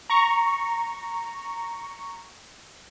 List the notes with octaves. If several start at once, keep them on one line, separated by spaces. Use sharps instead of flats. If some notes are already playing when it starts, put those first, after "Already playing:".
A#5 C#6